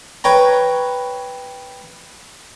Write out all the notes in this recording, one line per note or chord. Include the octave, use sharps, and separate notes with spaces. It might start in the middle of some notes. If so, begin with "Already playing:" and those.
B4 C#5 G5 A#5